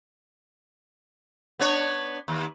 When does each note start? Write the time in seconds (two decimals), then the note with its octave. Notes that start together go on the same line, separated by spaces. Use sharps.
1.59 B3 D4 C#5
2.28 D#2